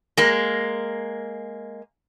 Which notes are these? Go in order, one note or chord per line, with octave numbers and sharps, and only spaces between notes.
G#3 A#3